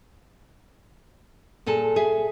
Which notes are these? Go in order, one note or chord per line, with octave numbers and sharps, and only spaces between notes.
A#2 G#4 A4 A5
G#4 E5